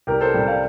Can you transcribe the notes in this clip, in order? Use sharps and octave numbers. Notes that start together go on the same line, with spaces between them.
C2 G4 A#4
A4 C5
C3 G3
D5 F5